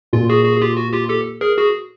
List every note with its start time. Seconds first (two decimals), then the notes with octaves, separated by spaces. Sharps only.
0.13 A#2 F4
0.29 F#4 G#4
0.45 F#4 G#4
0.57 G#4
0.62 F4 G4
0.77 F#4
0.93 F4 G4
1.09 G4 A4
1.41 G#4 A#4
1.57 F#4 G#4